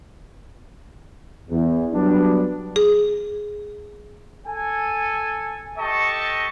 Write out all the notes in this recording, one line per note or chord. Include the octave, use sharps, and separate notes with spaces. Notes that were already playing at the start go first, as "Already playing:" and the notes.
E2
F#3 G3 B3 D4
G#4
A4 G#5
G4 A4 D#5 A5 C#6